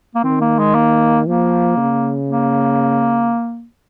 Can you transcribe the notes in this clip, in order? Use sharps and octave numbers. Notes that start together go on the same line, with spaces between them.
A#3
D#3 C4
A#3
G#3
A#3
F3 A#3
C#3
A#3